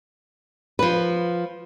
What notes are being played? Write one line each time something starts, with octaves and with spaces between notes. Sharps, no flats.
F3 B4